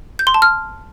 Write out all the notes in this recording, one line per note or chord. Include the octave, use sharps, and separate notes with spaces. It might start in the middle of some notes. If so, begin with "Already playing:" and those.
G6
C6
A5
F6